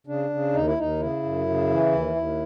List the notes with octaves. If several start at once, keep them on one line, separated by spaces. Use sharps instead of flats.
C#3 D4
C#3
D#2 D#4
E4
D#2 D#4
C#3 E4
F#2
C#3
E3
D#2
D#2